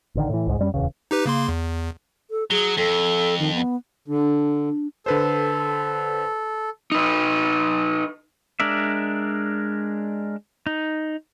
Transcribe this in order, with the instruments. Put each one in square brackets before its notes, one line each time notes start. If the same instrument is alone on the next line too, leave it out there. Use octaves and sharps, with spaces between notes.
[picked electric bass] A1 D3 D#3
A2 E3
C2 G#2 G#3
F#2 G3 C#4
D1 E2 C#3
[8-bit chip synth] D#4 G4 B4
C#3 A#3 C6
E2
[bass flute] A4
[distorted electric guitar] F#3 [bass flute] G#4
[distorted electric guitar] F2 [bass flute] A4
[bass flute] D#3
B3
[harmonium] D3 [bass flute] D4
[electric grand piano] D3 B4 C5 [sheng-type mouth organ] A4
[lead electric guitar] D#4 B4
[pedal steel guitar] G#3 D4 A#4 D5 E5
D#4